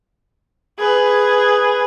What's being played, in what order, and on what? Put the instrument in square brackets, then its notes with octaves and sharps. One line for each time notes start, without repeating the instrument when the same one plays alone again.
[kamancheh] G#4 B4